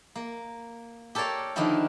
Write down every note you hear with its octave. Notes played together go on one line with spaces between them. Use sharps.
A#3
G4 A4 A#4 C#5 D5 F5
D3 D#3 F3 A#3 E4 G4